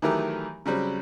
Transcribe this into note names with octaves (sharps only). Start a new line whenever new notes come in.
D#3 E3 F#3 A3 G4 A#4
C#3 F#3 G3 C4